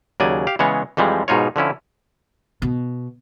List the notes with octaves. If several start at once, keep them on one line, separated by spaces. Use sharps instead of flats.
D#2 C#3 F#3 D5 G#5
G4 F5
C#3 E3 G#3 B3 C#5
F2 E3 F3 G3 G#3
G#2 B2 D#4 F4 C#5
D3 F3 C#4 E4
B2